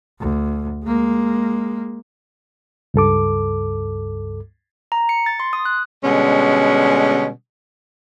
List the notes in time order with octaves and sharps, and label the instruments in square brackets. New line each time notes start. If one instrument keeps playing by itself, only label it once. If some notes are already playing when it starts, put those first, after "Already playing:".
[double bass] D2
G#3 A#3
[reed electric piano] C#2 G2 A4 D6
[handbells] A#5
C#7
A6
C6
D#6
F#6
[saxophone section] B2 D3 G3 G#3 C#4